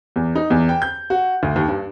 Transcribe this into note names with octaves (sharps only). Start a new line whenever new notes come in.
E2
D#4
E2
G5
G6
F#4
D2
D#2
G2